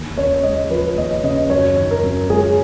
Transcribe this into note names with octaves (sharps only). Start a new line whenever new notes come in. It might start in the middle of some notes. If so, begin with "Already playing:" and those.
Already playing: D#2
C#3 C#5
G#3 D#5
F3 B4
D#2 D#5
C#3 D#5
F#2 C#5
D#3
A#4
F#2
G#3 G#4